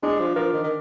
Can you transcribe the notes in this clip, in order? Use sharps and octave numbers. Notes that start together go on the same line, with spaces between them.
G#3 D4
F3
F3 A#4
D#3
D#3